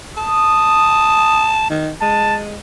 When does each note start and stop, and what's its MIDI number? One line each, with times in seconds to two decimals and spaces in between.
0.17 1.68 81
0.17 1.48 87
1.70 1.91 51
2.02 2.57 56
2.02 2.38 81